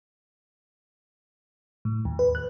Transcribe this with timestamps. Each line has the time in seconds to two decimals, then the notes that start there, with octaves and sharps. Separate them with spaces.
1.85 A2
2.05 D#2
2.19 B4
2.35 F#6